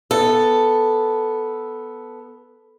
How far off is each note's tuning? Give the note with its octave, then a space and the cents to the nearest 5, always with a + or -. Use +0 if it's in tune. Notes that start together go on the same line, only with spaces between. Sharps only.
B3 +0 A4 +0